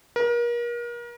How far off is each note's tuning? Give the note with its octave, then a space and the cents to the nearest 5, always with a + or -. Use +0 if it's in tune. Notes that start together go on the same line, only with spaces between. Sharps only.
A#4 +35